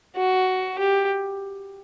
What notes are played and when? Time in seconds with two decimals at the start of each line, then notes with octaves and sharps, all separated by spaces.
0.16 F#4
0.79 G4